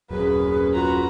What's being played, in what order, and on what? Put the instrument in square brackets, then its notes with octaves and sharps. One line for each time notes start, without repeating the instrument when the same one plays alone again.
[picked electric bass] D#1 F#2 [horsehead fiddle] C#4 B4 [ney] G#4
[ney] F4 [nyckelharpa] F#4 A#5